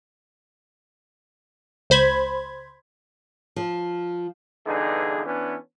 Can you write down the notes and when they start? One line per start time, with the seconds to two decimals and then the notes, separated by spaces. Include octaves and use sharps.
1.90 C#2 C5 B5 G#6
3.56 F3
4.67 E2 G2 D3 D#4 G#4
5.25 E3 B3 C#4 D4